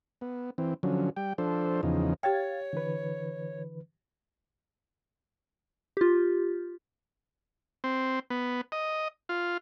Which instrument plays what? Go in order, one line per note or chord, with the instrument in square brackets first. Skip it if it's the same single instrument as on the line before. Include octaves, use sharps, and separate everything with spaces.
[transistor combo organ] B3
E3 C4
D3 F3 F#3 C#4
G3 G5
F3 D4 A4 C5
E2 C#3 F3 D#4
[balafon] G4 G5 [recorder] C#5 [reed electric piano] F5 G#6 A6
[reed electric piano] D3 E3 B4
[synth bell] F4 G4
[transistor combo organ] C4
B3
D#5
F4